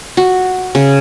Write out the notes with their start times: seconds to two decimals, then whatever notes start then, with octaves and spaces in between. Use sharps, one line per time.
0.17 F#4
0.75 C#3